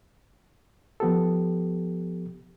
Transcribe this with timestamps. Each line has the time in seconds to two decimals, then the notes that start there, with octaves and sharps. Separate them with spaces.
1.00 F3 B3 G4 A4